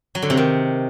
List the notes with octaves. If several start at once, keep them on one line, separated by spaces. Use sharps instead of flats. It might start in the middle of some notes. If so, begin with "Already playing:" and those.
F#3
D3
C3
D#3